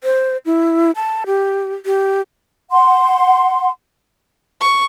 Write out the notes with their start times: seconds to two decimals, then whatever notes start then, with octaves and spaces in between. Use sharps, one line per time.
0.04 C5
0.46 E4
0.96 A5
1.26 G4
1.86 G4
2.71 F#5 C6
4.61 C#6